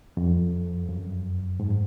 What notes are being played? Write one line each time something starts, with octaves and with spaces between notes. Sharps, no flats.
F2
F#2
G#2